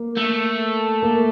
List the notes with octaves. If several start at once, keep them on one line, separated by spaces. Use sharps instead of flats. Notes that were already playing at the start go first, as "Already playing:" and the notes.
Already playing: A#3
A3
A#3